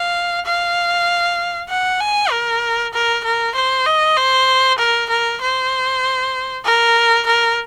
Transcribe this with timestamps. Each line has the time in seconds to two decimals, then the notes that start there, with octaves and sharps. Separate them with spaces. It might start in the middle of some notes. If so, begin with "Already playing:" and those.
Already playing: F5
0.45 F5
1.69 F#5
2.00 G#5
2.31 A#4
2.93 A#4
3.24 A#4
3.55 C5
3.86 D#5
4.17 C5
4.78 A#4
5.10 A#4
5.41 C5
6.65 A#4
7.27 A#4